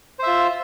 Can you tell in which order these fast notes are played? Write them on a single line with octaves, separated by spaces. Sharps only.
C5 E5 F4